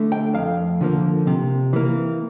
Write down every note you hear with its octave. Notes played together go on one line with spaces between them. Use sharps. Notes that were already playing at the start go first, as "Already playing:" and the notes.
Already playing: D3 A3
G5
F2 F5
D3 F3 A#3
C3
E3 A#3